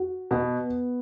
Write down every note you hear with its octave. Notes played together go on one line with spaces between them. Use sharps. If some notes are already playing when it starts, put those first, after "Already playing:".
Already playing: F#4
B2 B3